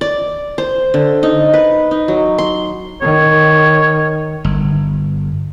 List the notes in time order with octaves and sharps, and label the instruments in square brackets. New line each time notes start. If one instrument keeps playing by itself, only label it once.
[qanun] D5
C5
D3
D#4
B4
D#4
F#3
C6
[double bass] D#3 [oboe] C#5
[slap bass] G1